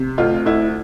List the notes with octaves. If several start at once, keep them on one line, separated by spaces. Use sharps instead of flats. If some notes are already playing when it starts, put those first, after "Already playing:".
Already playing: C3
D2 F4
D2 E4